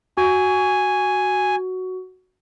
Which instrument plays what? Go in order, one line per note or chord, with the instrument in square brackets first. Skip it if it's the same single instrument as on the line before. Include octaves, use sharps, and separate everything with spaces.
[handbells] F#4 [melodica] G#5